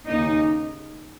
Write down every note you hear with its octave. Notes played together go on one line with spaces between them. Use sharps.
D#2 C#3 A#3 D#4